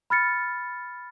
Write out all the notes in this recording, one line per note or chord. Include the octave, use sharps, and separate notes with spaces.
B5 F6 A6 C#7